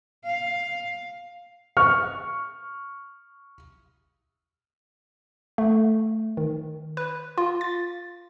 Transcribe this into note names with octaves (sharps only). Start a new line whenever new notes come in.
F5
C#6 F6
A3
D#3
B4
F4
A6